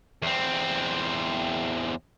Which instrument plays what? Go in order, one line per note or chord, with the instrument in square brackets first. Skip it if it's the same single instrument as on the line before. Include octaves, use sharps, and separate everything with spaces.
[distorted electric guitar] E2 C4